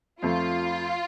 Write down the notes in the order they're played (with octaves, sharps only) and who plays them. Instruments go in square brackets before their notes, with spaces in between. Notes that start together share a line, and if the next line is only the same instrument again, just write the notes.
[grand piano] F2 F3 A3 [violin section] F4